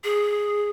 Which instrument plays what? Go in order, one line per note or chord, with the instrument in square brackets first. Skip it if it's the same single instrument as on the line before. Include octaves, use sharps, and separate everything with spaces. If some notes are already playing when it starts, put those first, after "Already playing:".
[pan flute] G#4